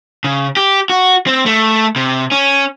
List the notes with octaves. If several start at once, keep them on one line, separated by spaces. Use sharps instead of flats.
C#3
G4
F#4
C4
A3
C3
C#4